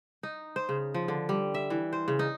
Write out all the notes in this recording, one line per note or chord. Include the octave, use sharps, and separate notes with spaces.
D#4
C5
C#3
F3
D3
G3
E5
E3
C5
C#3
D#4